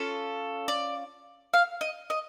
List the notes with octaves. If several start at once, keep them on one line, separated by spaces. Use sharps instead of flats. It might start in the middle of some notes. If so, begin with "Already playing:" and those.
Already playing: C#4 F4 A4
D5
F5
D#5
D#5